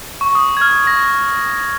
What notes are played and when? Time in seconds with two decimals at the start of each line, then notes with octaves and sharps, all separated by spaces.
0.21 C#6
0.35 D#6
0.57 G#6
0.62 F6
0.87 A#6